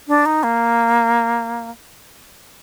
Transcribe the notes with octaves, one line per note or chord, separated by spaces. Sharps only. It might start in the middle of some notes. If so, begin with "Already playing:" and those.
D4
D#4
A#3